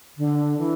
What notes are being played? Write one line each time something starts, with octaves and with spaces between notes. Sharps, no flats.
D3
E3